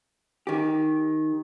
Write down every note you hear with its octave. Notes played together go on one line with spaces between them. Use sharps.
D#3 G4